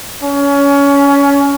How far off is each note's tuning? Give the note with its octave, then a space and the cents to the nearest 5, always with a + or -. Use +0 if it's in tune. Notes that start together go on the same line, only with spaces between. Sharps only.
C#4 +25